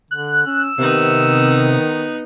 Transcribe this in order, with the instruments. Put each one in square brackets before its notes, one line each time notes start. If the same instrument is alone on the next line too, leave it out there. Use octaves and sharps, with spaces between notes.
[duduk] D3 [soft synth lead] F#6
[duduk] C#4 [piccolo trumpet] E6
[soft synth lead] C3 [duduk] D#3 [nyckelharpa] B3 D#4